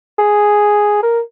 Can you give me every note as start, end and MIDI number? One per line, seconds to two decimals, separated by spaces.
0.18 1.02 68
1.03 1.20 70